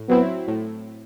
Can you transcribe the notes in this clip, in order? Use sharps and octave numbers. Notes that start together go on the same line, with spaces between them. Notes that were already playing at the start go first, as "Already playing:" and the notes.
Already playing: A2
F#3 B3 C4 E4
A2